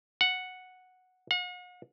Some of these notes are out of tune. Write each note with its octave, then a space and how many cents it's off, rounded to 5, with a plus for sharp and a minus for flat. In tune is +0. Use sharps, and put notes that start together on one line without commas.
F#5 -5
F#5 -45